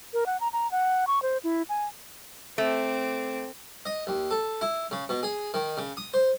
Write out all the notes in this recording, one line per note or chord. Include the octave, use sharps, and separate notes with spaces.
A#4
F#5
A#5
A#5
F#5
C#6
C5
E4
G#5
A3 C4 D6
D#5
D#2
A4
E4
C#3
B2
G#4
D#3
C#3
D#6
C5